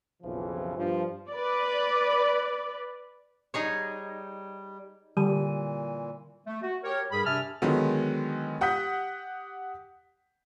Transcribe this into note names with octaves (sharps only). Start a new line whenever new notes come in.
B1 F2 C#3 E3 F3
G2 F3
B4 D5
G3 D#4 G#4 C#5
A#2 D3 E3 G3 D#7
A3
F#4
G4 A#4 C#5
G2 G3 G#4 A#4 B5
C3 D4 E5 G#5 A5 F6
D3 D#3 F#3 G#3 B3
G4 F#5 D#6 G6 B6